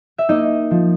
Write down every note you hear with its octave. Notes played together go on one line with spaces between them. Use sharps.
E5
A#3 D#4 D#5
F3